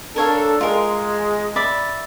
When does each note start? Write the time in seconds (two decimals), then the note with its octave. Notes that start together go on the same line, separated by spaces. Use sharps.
0.16 D4 A4 A#4 C#5 F5
0.61 G#3 F4 A#4
1.56 D5 E5 B5